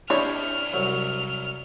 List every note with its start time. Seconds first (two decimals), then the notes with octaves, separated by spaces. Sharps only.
0.10 D4 E4 G4 C#5 D#5 B5 F6
0.73 C2 F#3